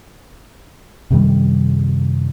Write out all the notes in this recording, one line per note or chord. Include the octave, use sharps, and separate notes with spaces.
F#2 C3 D#3 G3